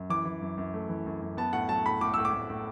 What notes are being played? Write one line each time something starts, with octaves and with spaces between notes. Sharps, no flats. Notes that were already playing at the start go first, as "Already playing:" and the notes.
Already playing: F#2
E3 D6
E3
F#2
F#2
A3
E3
F#2
F#2
B3 A5
A2 F#5
F#3 A5
A2 B5
A2 D6
A2 E6
D6
A2
A2